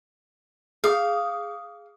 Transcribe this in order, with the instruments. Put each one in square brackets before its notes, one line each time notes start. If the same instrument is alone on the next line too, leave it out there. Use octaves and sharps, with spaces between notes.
[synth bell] G#4 D#6 [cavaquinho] F5